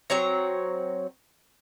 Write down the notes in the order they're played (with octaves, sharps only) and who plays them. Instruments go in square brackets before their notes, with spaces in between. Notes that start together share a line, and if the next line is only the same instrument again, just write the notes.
[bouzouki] F#3 C4 C#5 A#5